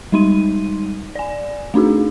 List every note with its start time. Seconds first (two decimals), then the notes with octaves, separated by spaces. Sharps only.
0.12 G3 G#3 D#4 C6 D#7
1.15 D5 G#5
1.74 A3 D4 D#4 F#4 G#4